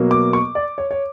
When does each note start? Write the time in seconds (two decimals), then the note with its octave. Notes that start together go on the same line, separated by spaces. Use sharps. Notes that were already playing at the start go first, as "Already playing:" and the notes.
Already playing: B2 F#3 A#3
0.11 D6
0.33 C#6
0.55 D5
0.78 C#5
0.91 C#5